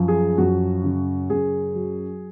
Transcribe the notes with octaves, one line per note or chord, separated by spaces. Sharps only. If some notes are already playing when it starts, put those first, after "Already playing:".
Already playing: F#2 F3
G#4
F#2 F#4
C#3
F#2 G#4
F#3